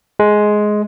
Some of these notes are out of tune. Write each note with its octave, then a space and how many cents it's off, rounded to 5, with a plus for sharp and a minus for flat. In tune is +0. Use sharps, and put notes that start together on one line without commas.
G#3 +10